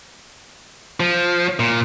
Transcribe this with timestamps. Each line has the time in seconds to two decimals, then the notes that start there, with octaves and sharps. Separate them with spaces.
1.00 F3
1.59 A#2